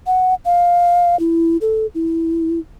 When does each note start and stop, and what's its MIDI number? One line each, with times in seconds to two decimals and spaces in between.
0.07 0.34 78
0.45 1.18 77
1.19 1.57 64
1.61 1.86 69
1.95 2.59 64